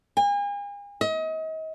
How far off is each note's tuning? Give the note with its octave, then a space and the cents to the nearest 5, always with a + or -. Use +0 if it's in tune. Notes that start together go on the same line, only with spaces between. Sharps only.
G#5 -40
D#5 +35